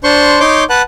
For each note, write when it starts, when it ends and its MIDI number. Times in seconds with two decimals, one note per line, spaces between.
0.04 0.39 62
0.04 0.39 72
0.04 0.39 84
0.04 0.39 85
0.40 0.64 63
0.40 0.64 73
0.40 0.64 84
0.40 0.64 86
0.40 0.64 91
0.70 0.82 71
0.70 0.82 78
0.70 0.82 81
0.70 0.82 90